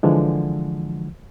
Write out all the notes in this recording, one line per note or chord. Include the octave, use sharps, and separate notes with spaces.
D3 E3 F3 G#3